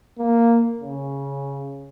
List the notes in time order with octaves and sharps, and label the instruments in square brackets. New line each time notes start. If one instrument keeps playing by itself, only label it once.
[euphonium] A#3
C#3